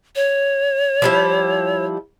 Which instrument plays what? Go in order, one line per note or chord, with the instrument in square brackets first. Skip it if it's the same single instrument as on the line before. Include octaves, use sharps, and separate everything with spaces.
[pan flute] C#5
[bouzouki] F3 G3 E4